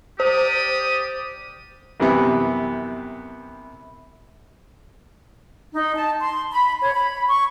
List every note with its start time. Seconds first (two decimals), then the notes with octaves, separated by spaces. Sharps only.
0.20 G4 C5 D5 D#6
2.00 F#2 C3 E3 G3 B3
5.74 D#4
5.95 A5
6.21 C6
6.51 B5
6.81 C#5
6.95 B5
7.28 C#6